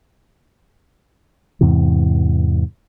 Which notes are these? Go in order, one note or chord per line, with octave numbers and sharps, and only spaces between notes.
E2 G#2 C3 E3